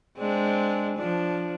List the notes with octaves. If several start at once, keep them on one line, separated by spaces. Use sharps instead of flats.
G#3 C4 D4
F3 D4